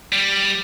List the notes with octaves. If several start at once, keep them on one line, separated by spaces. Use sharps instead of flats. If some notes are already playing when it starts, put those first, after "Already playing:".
G3